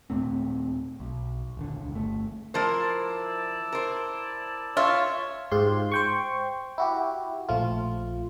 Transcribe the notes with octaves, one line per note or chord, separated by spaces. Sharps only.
D#2 A#2 A3 C4
B1
D#1 D3
C#2
G1 A3
F3 E4 A#4 C5 D5 A5
A#4 C5
F4 C#5 E5
G#2 F4 G4 C6
C5 G5 C#6
E4 F#4 G4
A#1 F3 A3 F4